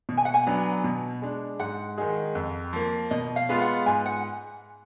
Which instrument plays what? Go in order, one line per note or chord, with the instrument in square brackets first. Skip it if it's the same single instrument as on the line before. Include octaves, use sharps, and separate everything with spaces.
[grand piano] B2
[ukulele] G#5
F#5
G#5
[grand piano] F#3 B3 D4
B2
G#3 D4
[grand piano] G#2 [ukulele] F#5
[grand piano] D#3 G#3 D#4 G#4
F2
F3 A#3
[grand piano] B2 [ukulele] D#5
[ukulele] F5
[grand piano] G#3 B3 F4
[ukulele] F#5
[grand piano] G#2 [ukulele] G#5
[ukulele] F#5